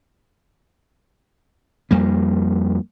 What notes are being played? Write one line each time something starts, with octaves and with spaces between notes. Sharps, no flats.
F2 G3 A#3